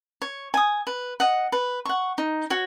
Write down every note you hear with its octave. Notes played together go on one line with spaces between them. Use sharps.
C#5
G#5 D#6
B4
D#5 F#5
B4
F#5 C#6
D#4
F#4 C#5